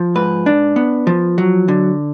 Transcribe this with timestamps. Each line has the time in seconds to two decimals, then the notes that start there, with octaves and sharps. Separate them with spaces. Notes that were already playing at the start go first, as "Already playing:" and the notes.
Already playing: F3
0.15 G#2 B4
0.46 D4
0.76 B3
1.07 F3
1.38 F#3
1.68 D3